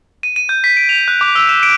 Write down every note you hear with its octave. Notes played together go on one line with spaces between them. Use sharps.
D#7
D#7
G6
B6
D7
F7
F#6
D6
E6
E7
D7